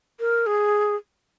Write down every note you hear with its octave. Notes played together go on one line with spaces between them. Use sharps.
A#4
G#4